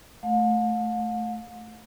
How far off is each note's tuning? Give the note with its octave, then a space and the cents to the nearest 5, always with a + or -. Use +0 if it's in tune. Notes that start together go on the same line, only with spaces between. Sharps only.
A3 -10 F5 +45